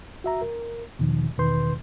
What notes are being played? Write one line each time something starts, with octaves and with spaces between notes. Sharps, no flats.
F#4 E5 A#5
A#4
E2 B2 D#3 F3
E2 B2 D#3 B4 C6 G6